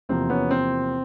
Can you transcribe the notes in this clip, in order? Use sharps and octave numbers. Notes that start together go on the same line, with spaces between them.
E2 C3 F3 A#3 C4
B3 C#4
C4